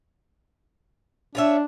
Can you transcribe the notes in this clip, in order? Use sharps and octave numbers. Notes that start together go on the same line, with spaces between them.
D4 F4 C#5 E5